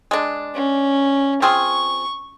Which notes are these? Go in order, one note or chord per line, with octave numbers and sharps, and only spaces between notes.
G#3 D4
C#4
C4 F4 G#4 C#6